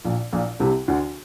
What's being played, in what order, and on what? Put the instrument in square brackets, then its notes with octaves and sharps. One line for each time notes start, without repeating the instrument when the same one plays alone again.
[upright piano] A#1 A#2
A#1 A#2
C2 C3
D2 D3